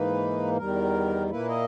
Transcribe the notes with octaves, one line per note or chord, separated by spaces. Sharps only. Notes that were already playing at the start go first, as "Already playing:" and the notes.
Already playing: G#2 E3 A#3 D#4 B4
E2 D#3 G3 A#4
A#2 A#3 E4 B4
D#5